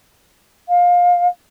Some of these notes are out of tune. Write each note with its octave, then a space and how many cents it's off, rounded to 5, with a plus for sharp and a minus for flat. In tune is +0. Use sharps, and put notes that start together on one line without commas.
F5 +20